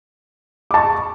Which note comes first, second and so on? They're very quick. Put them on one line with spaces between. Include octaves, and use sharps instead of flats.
D6 A5 C#6